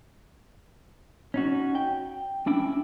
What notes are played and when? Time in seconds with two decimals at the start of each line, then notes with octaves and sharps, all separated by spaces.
1.34 C#4 D#4 F#4
1.75 G5
2.46 C#4 D4 E4 G5